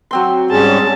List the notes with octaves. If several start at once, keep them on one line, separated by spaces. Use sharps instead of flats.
F#3 C4 C6
G#2 G3 C#4 G#4 A5